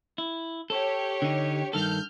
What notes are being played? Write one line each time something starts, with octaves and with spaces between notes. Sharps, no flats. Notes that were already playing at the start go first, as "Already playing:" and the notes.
E4
G4 A4 C#5
D3 D#4
G2 D#3 A4 F6 G6